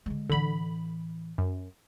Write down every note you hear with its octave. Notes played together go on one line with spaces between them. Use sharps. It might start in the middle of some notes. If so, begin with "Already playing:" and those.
D3 G#3
A2 D3 E3 B5
F#2